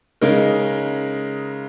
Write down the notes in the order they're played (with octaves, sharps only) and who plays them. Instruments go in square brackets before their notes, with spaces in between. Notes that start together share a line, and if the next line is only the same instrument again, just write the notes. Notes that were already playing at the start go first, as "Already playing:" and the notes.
[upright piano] C#3 G#3 D#4 A#4